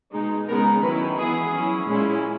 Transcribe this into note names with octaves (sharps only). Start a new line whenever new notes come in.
B2 G#3 D#4
C#3 G#3 B3 D#4 A#4
D#3 F#3 C#4 E4 B4
E3 B3 E4 G#4
F#3 C#4 E4
A#2 G#3 C#4 E4